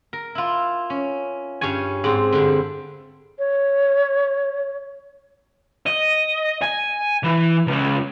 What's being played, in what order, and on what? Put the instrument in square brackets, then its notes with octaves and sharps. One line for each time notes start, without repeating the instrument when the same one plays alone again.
[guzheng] A#4
E4 F4
C#4
G2 C#4 C#5 G#5
G#2 C4
G2 D3
[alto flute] C#5
[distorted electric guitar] D#5
G#5
E3
C#2